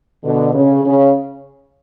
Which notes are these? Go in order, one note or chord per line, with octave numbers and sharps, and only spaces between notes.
B2 D3
C#3
C#3